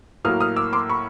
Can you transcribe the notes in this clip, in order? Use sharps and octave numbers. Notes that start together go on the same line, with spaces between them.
A2 F#3 A#3 D#6 F6
D#6 F6
D6 E6
C6 D6
B5 C#6